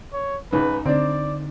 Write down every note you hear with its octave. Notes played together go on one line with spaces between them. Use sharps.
C#5
C#2 G#2 D#4 B4
D3 C4 D4 D5